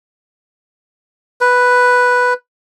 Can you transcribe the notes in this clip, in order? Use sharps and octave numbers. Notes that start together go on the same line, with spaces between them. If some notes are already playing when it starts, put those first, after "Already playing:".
B4